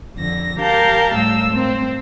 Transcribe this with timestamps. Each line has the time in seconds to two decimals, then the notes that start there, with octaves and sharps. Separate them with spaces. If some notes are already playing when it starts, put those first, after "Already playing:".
0.15 F2 D3 A#6
0.58 G4 A#4 F5 A5 G6
1.14 A2 G3 E6
1.53 C4